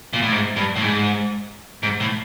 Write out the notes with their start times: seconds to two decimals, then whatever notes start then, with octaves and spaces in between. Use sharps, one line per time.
0.13 A#2
0.22 A2
0.32 G#2
0.56 G2
0.76 A2
0.82 G#2
1.83 G#2
2.00 A2